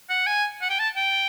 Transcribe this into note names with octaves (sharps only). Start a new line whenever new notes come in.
F#5
G#5
F#5
G5
A5
G5